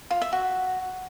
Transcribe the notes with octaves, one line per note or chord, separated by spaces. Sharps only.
F4
E5
F#4